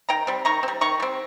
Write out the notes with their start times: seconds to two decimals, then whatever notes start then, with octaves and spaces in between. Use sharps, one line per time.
0.09 D#3 G5 A#5
0.27 G3 C4
0.45 D#3 A#5 C#6
0.63 C4
0.68 G3
0.81 D#3 A#5 C#6
1.00 G3 C4